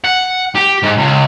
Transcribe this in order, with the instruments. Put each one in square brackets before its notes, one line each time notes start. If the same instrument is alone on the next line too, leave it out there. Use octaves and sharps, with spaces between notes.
[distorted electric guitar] F#5
G4
G#2
C#2